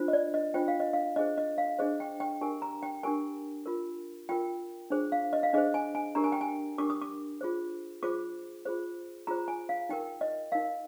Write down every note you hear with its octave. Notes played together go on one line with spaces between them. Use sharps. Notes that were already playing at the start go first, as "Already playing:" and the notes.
Already playing: D4 F4 C5
D#5
D5
D#5
D4 F4 C5 G5
F5
D#5
F5
D4 G#4 C5 D#5
D#5
F5
D4 G#4 C5 D#5
G5
G5
D4 G4 A#4 G#5
A#5
G5
D4 G4 A#4 G#5
F4 A#4
F4 A#4 G5
D4 G#4 C5
F5
D#5
F5
D4 G#4 C5 D#5
G#5
G#5
D4 G4 A#4 A#5
G#5
G5
G#5
D4 G4 A#4 D6
D#6
D6
F4 G#4 C5
F4 G#4 C5 D6
F4 G#4 C5
F4 G#4 C5 A#5
G#5
F5
D#4 A#4 G5
D#5
D#4 A#4 F5